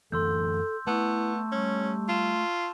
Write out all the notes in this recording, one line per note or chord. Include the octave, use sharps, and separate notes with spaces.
F#2 E3 A3 A4 C6 E6 G6
A3 B3 E4 A5 C#6 E6
G3 C#4
F4 A5 E7